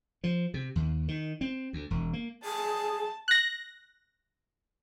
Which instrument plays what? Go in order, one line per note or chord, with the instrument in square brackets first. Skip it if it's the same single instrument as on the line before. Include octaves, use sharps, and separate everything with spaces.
[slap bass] F3
C3
D#2
D#3
C4
D2
E1
A#3
[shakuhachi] G#4 [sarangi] A5
[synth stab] F#6 A#6